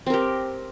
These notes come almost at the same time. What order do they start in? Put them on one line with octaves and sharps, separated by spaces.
C4 A#4 G4